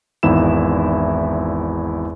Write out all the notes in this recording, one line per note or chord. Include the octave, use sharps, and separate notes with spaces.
G#1 E2 D#4 E4 E5 E7